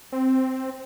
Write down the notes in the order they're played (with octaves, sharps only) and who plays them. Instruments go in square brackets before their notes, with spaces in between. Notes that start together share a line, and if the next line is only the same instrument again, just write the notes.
[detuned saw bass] C4